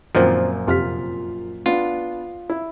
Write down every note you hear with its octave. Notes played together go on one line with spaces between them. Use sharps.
F#2 A#2 D#3 F3 C4
F2 C3 F4 F6 B6
B3 D4 F4
E4